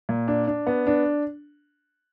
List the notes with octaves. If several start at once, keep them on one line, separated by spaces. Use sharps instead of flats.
A#2
D4
D4
B3
D4